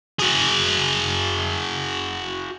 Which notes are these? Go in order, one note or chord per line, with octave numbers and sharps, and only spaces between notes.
F#4 G#4